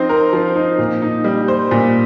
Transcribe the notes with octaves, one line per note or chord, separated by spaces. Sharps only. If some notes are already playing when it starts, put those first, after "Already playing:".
Already playing: F3 C4 D#4
A#4
F3
D#4
A#2
D#4
G3
C5
A#2